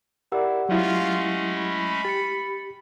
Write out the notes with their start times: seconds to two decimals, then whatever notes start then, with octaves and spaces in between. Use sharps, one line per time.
0.32 E4 G4 A#4 D5 F#5 E6
0.69 F#3 G#3 A3 C#4 E4 F4
1.54 B5
2.05 G4 A6 C#7